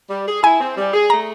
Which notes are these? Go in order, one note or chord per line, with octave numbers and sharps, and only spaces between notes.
G3
G#4
E4 G#5
C4
G3
G#4
A3 A#5